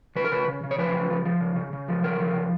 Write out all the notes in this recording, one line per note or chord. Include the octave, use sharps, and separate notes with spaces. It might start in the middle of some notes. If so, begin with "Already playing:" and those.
C#3 B4
A#4
C#3 B4
C#3
C#3
C#5
F3 B4
C#3
F3
F3
C#3
C#3
C#3
F3
C#3 A#4
F3
C#3